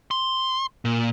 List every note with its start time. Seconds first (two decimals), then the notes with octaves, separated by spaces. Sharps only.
0.11 C6
0.85 A#2